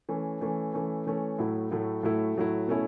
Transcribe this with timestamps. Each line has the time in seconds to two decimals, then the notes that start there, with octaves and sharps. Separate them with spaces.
0.09 E3 A3 C#4
0.41 E3 A3 C#4
0.73 E3 A3 C#4
1.06 E3 A3 C#4
1.39 A2 F#3 A3 E4
1.71 A2 F#3 A3 E4
2.03 A2 F#3 A3 E4
2.36 A2 F#3 A3 E4
2.68 B2 A3 C#4 E4